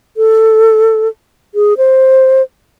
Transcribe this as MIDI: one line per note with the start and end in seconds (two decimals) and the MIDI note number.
0.17 1.08 69
1.55 1.74 68
1.78 2.42 72